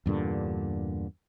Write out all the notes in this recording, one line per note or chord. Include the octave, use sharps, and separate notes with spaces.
E2 G2 A#2 D3